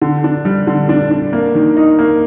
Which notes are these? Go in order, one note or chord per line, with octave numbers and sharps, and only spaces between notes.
D3
D4
G3
D3
D4
D4
A#3
D#3
D#4
A#3